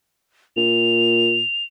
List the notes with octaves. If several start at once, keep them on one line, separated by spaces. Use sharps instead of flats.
A#2 F7